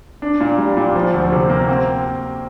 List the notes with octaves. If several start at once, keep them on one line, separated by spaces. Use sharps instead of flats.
D4
A#2
G3
A#2
F3
D2
C3
A#3
C4